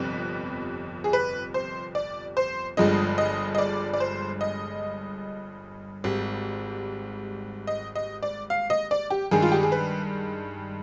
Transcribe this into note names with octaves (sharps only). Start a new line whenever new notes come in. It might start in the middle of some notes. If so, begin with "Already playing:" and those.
Already playing: G1 F2 C3 G3 B3 B4
G#4
B4
C5
D5
C5
G1 G2 F3 G#3 D#5
D#5
D#5
D5
D5
C5
D#5
G#1 G#2 G3
D#5
D#5
D5
F5
D#5
D5
G4
G2 D#3 G#3 G#4
F4
G4
G#4
B4